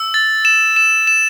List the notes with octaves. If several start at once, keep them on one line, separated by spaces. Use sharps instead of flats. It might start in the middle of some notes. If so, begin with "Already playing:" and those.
Already playing: E6
A6
E7
E7
E7